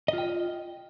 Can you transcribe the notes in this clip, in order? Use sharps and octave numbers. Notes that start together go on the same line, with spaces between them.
F4 D#5 G5